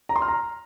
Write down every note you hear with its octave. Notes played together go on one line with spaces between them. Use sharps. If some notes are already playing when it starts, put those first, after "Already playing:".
A#5
C6
F6
A#5